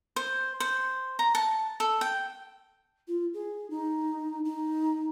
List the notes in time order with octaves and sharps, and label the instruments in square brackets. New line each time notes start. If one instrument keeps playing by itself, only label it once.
[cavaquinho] C5
C5
A#5
A5
A4
G5
[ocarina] F4
G#4
D#4
D#4